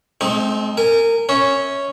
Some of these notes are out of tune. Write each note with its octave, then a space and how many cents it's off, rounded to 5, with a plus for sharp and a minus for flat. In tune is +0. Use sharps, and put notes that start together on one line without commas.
G#3 +45 C4 +0 D#4 +0
A#4 -25 G#5 +0
C#4 +0 C#5 +0 E5 -30